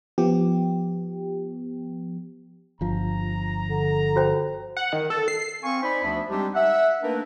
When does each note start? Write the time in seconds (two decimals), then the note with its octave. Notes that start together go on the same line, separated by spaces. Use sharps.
0.18 F3 B3 G4
2.81 G1 F3 A#5
3.68 D3
4.16 F#4 C5 G5
4.77 F#5
4.93 D#3
5.10 A4
5.28 C7
5.63 C4 F5 G#5 C#6
5.82 D#4 C5 D5 G#5 B5
6.03 D2 F3 B3 D4 E5 B5
6.29 G3 G#3 C4 D4 D#4 G4
6.54 E5 F#5
7.02 A3 A#3 D4 D#4 A#4 B4